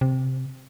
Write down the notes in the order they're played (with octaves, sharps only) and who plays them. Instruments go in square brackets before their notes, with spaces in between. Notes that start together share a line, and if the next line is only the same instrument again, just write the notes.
[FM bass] C3